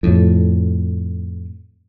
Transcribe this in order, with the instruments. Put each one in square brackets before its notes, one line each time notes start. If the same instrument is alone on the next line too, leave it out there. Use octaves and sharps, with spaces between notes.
[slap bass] F2 A2